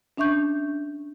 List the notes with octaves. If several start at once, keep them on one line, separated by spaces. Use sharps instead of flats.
C#4 D4 E5 C#6 G6